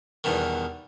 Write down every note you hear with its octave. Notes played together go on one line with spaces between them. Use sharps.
E2 G2 B2 D#3